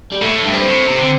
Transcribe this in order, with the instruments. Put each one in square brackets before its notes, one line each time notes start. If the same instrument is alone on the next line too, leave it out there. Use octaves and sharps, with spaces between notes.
[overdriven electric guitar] G3
[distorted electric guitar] A2 [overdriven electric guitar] A3
[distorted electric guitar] G2
[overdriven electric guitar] C4
[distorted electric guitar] A2
C3
D3